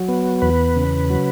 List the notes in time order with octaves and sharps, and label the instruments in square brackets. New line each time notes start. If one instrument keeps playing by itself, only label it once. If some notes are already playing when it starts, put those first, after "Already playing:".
Already playing: [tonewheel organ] F#3
B3
E2 B4
C#3
F#3